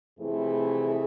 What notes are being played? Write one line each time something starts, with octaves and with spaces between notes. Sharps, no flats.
F2 C3 E3 A3 C4 E4 G#4